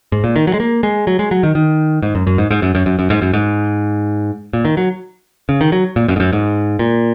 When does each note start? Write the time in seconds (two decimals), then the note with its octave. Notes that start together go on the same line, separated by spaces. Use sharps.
0.12 G#2
0.24 A#2
0.36 D#3
0.47 F#3
0.54 G#3
0.60 A#3
0.83 G#3
1.07 F#3
1.19 G#3
1.31 F#3
1.43 D#3
1.55 D#3
2.02 G#2
2.15 F#2
2.27 F#2
2.38 G#2
2.51 G#2
2.62 F#2
2.75 F#2
2.86 F#2
2.99 F#2
3.10 G#2
3.22 F#2
3.33 G#2
4.53 A#2
4.65 D#3
4.77 F#3
5.49 C#3
5.61 D#3
5.72 F#3
5.96 A#2
6.08 F#2
6.16 G#2
6.20 F#2
6.33 G#2
6.79 A#2